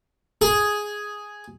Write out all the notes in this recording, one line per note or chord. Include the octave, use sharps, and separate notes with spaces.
G#4